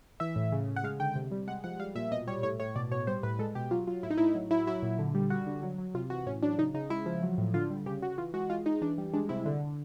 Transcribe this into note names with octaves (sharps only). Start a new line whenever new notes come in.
E3 E5
A2
C#3
C#3
F#5
G#3 F5
D3 G5
C3
G3
G#3 F#5
F3 F#5
G3 F5
A#2 E5
B2 D#5
G3 C#5
A2 C#5
A2 C#5
B2 D5
B2 C#5
G3 C5
A2 B4
G#3 A4
B2 G4
F#3 F4
F#3 F4
A2 E4
D#4
A2 E4
F#3
F#3 E4
F#3 E4
A#2
D3
G3
G3 F#4
D3
F#3
F#3
C3 F4
E3 F#4
A2 C#4
F#3 D4
C#3 D#4
C#3 D#4
G#3 E4
F3
F#3
A2
D3 F4
G3
C#3 G4
C#3 F#4
E3 F4
G#3 F#4
G#3 F4
G#3 D#4
E3 D4
G3
G#3 D4
C3 E4
D3
D3